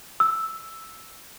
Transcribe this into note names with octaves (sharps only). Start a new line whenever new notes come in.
E6